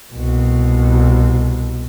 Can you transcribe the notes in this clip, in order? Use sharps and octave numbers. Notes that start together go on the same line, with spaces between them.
C2 B2